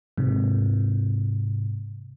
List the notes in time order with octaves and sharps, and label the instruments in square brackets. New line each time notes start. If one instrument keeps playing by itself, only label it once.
[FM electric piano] G#2 C3